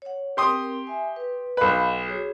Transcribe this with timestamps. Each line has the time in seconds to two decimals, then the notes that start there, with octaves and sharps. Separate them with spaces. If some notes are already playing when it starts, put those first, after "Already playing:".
0.02 C#5 F#5
0.37 C4 G4 A#4 C6 D#6
0.87 E5 G#5
1.16 B4
1.57 B1 B4 D#5 F5 F#5
2.06 F#4 G#4 C#5